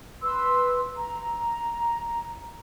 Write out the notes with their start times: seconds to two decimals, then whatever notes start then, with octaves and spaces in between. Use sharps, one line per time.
0.23 B4 C6 E6
0.97 A#5